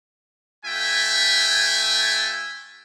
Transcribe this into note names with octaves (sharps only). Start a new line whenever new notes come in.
A3 F4 E5 G5 G#5